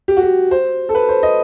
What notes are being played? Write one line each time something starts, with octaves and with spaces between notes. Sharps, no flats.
G4
F#4
G4
C5
A4
B4
C5
D#5